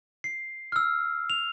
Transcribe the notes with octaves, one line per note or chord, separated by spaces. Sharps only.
C7
E6 F6
F7